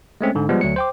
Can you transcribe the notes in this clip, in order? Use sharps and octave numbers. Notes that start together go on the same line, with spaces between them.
G#3 A3 C4 C#4
G#2 D3
F3 G3 G#3 B3
D2 F#3 C#7
C5 G5 D6